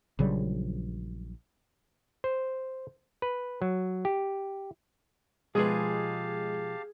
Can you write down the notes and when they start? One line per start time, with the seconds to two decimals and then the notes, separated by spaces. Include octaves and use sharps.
0.19 A#1 C#3 F#3 G3
2.24 C5
3.22 B4
3.62 F#3
4.05 G4
5.55 B2 F3 G#3 G4 G#4 B4 F5 A5